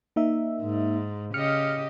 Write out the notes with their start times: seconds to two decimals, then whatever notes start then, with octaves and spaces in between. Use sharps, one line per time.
0.16 A#3 D#4 E5
0.61 G#2
1.34 C#3 G4 D#5 F6 C#7